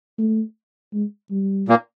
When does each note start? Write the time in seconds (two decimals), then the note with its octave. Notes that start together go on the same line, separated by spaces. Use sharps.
0.18 A3
0.93 G#3
1.31 G3
1.68 A#2 A#3